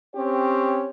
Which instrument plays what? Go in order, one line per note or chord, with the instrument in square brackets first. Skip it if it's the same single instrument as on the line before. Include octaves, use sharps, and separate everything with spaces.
[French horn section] C4 C#4 G4 C#5